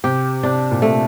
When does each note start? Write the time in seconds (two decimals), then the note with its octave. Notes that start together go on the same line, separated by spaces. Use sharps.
0.04 C3 G4
0.43 C3 D4
0.71 A#2
0.82 C3 A3